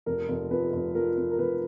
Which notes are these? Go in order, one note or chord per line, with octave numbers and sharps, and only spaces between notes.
F1 A#4
F1
F2 B4
F1
F2 A#4
F2
A#4
F1 B4